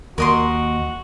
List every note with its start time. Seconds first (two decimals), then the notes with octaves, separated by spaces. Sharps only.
0.18 D#2 F#4 A#4 D#5 C6